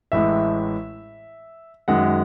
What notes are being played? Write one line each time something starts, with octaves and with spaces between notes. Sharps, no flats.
A1 A2 G#3 E5
F#2 D#3 G#3 F#5